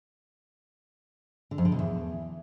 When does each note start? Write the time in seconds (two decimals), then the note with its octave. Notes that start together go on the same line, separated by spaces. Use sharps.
1.51 D3
1.58 F2
1.65 D3
1.72 B2
1.79 E2